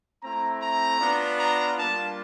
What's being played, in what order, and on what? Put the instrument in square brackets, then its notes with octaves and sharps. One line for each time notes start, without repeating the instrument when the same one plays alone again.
[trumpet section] A3 C4 E4 A#5
A#5
B3 D4 F4
A#5
G3 A#3 D4 F4 A5